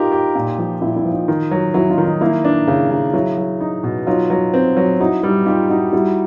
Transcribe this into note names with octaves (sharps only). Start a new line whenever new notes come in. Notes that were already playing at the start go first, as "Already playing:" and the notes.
Already playing: D#4 F4 G4 A#4
G4
A#2
F3
A#2 E4
E4
F3
D#4 F4
D#3
F#3
F#3 E4 F#4
D#4 F4
D#3
D#4
A#3 E4
D4
C#3
C#3
F#3 E4
F#3
D#4
B2
F#3 D#4 F4
F#3
C4
F#3
D#4 E4 F#4
G3 E4 F#4
D#4 F4 G4
D#4 E4 F#4
G3 E4 F#4